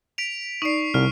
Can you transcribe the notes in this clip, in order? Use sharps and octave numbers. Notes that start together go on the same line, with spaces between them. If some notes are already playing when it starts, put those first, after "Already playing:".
B6 D7 F7
D#4 D5 C#6 C7
C2 F6